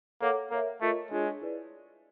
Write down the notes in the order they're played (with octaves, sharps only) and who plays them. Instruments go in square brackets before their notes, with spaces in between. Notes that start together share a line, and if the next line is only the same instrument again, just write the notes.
[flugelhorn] A#3 [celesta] A4 C#5 F#5 A#5 D6
[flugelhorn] A#3 [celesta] A#4 C#5 E5
[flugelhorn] A3 [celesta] F4 A#4 D#5
[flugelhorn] G#3 [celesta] D4 F4 G#4 C#5
[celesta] E4 G#4 B4 D5